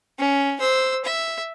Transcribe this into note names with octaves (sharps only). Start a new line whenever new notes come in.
C#4
C5 E6
E5